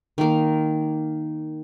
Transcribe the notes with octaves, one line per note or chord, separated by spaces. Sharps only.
D#3 A#3